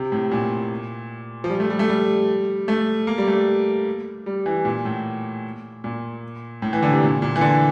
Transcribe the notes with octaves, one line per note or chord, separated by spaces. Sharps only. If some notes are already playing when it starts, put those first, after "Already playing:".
Already playing: C3
A2
A#2
F3
G3
A3
G3
A3
G3
A3
A#3
G3
A3
G3
E3
A#2
A2
A#2
A2
E3
D3
C3
A#2
A#2
E3
D3